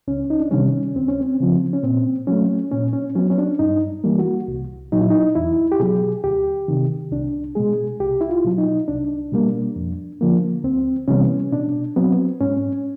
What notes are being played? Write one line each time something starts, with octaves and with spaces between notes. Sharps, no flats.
C#2 C#4
D#4
D4
C3 D#3 G3 C#4
D2 C4
C#4
C4
C#3 F3
C#4
A#2 C4
F#3 A3 C#4
A#2 C#4
C#4
F#3 B3 C#4
C#4
D4
G2 D#4
E3 G3 A#3
F#4
C2
A#2 F#3 D#4
E4
D#4
E2 E4
G4
B2 F#3 G#4
D2 G4
C3 D#3
C2 D4
B2 G#3 G#4
C2 G4
E4
F4
B2 F#3
D#4
C2 D4
B2 G3 A#3
F2
D3 F3 A#3
D2 C4
C3 E3 G3 B3 C#4
B2 D4
F#3 B3 C4
G#2 C#4